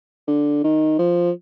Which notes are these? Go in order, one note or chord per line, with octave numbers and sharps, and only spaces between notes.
D3
D#3
F3